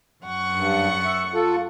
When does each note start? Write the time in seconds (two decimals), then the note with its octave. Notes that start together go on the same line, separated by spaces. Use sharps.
0.24 F#2 F#5 C#6
0.56 G2
1.05 E5
1.34 F4 A4